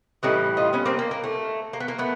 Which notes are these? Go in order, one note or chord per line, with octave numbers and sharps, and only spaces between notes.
A2 E3 G3 C#4 D#4
D#4 F4
B3 C#4
A#3 C4
A#3
A#3
A3
A#3
B3
A#3
A3 B3